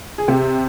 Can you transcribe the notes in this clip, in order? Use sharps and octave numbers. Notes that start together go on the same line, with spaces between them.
G#4
C3 G4